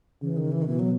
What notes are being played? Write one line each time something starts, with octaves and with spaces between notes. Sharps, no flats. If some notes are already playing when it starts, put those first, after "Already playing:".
C#3 E3
D#3
E3
D#3
B2 E3
F#3